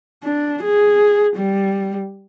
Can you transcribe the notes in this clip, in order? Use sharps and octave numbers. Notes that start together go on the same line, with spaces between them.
D4
G#4
G3